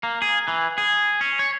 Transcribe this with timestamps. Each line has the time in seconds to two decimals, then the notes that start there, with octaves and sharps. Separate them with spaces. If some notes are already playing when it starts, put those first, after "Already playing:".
0.03 A#3
0.22 G#4
0.48 E3
0.78 G#4
1.21 C#4
1.39 C#5